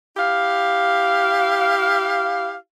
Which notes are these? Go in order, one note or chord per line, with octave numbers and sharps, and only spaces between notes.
E4 G4 F5